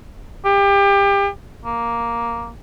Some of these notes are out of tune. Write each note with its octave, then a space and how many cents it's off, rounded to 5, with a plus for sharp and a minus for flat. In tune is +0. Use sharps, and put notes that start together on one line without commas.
G4 +30
A#3 +5